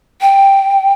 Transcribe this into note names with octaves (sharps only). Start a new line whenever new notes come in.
G5